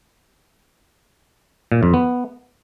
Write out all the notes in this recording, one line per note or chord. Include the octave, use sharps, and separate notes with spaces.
A#2
F2
B3